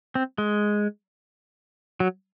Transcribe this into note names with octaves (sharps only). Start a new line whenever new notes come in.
C4
G#3
F#3